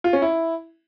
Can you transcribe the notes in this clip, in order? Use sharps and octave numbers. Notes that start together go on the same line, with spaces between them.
F4
C#4
E4